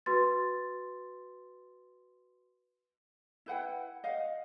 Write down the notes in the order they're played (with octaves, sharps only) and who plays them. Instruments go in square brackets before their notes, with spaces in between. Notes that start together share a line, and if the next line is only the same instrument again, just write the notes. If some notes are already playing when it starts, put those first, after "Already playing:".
[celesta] F#4 B4 C6 A6
[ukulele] E4 B4 F#5 G5
D#5 F5 F#5